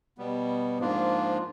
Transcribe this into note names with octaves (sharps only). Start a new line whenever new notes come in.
B2 G3 B3
G#2 F3 A#3 D4 F4